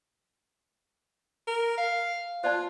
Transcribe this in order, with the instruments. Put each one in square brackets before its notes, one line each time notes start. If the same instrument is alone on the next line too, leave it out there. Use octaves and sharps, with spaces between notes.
[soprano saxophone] A#4
F5
[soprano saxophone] F4 [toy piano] C5 D5 A5